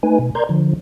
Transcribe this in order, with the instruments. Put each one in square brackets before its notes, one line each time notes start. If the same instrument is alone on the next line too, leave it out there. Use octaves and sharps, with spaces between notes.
[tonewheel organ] A3 D#4 B4 G#5
B2
A#4 D5 A#5 C6 G6 G#6
D3 F3